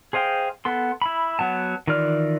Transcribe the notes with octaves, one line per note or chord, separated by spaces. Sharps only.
G#4 C5 D#5 F5 G5
B3 A4 C6
E4 B5
F#3 B3 A5
D#3 E3 F4 D5 F6